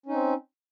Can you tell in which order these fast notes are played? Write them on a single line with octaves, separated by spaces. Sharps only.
C#4 D#4 C4